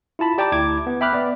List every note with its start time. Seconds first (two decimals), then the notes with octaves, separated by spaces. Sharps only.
0.19 E4 F4 A5 B5
0.38 G4 D5 G5 A5 A#5 D6
0.52 D2 E4 D6 G#6
0.86 B3
1.01 E5 G5 B5 D6 F6 F#6
1.13 B3 D5